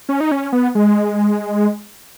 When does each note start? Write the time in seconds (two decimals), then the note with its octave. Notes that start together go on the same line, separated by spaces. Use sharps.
0.09 C#4
0.20 D#4
0.31 C#4
0.53 B3
0.75 G#3